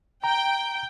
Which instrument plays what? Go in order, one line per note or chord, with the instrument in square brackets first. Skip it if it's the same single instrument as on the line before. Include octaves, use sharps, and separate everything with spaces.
[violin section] G5 [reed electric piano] A#5